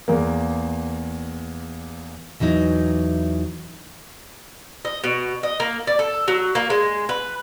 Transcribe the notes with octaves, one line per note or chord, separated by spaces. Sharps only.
E2 A#3
E2 E3 F#3 D#4
D#5
B2
D#5
A#3
D5
A4
F#3
A#3
G#3
B4